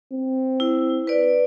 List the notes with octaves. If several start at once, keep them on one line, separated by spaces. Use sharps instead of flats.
C4
E4
B4 D5